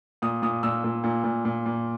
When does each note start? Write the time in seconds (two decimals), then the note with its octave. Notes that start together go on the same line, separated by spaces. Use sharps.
0.22 A#2 D#6
0.42 A#2 D#6
0.63 A#2 E6
0.84 A#2
1.04 A#2
1.24 A#2
1.45 A#2
1.66 A#2